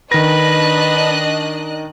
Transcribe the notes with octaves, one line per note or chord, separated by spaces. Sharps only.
D#3 D4 B4 D#5 F#6 A#6